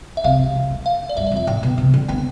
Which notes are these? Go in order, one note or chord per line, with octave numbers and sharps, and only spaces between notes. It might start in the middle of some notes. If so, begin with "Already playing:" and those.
E5
C3 F5
C3
C3
A3
F5
D5
G2 E5
D5
F2
E5
A2 G5
B2
C3
D3
B3 G5